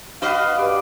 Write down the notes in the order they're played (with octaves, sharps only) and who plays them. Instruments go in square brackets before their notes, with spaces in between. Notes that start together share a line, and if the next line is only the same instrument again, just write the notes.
[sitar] F#4 B4 D#5 [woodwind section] F5
[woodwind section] G2 D6